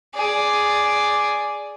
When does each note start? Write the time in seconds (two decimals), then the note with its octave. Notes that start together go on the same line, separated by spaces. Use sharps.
0.14 G#4 D5